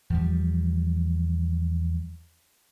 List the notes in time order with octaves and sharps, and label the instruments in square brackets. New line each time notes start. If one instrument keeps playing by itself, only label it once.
[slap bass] E2 F3 G3